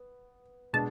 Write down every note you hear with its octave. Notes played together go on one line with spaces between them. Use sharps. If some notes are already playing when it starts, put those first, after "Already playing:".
Already playing: B3
B2 G#3 D4 A5